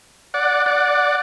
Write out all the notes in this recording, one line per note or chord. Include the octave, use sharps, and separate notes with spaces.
D5 F#5
D5 F#5